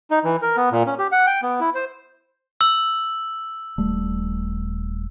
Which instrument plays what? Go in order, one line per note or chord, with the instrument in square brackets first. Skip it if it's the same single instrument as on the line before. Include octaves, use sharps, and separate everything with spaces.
[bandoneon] D#4
E3
A#4
B3
A#2
C#4
G4
F#5
G5
B3
E4
C5
[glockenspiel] E6 F#7
[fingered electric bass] D#1 G3 A3